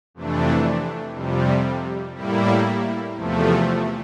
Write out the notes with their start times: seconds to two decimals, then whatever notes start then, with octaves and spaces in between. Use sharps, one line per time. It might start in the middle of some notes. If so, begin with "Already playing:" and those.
0.14 F2 C3 E3 A3 D4
1.15 F2 C3 G3
2.15 A2 G3 A#3 E4
3.16 E2 C3 F3 A3